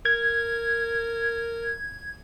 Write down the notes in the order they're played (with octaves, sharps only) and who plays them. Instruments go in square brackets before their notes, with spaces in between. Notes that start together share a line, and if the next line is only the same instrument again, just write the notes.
[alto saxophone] A#4 [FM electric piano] G#6